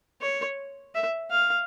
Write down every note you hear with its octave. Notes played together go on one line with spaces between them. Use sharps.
C#5
E5
F5